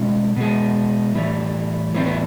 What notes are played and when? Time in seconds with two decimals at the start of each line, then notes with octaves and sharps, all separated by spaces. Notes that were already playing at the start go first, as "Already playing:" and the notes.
Already playing: B2 G#3 C#4
0.36 B2 G#3
1.15 A2 E3 G3
1.94 A2 E3 G3 C4
2.06 B3